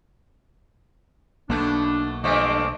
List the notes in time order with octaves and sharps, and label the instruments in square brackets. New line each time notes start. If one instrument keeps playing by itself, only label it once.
[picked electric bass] B1 A#3 [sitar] B2 A3 [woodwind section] D4
[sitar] G2 D3 F3 [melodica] A3 D6 [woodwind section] D#5